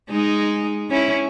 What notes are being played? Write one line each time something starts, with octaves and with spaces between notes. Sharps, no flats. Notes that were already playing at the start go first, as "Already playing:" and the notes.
G#3 D#4
C#4 E4